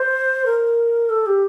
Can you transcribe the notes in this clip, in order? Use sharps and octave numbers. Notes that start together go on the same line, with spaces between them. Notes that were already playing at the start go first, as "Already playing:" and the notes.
Already playing: C5
A#4
A4
G4